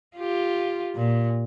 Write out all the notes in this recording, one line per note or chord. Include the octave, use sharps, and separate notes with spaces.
F4 G4
A#2